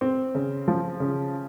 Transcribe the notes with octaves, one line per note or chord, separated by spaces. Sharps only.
C4
C#3
F3
C#3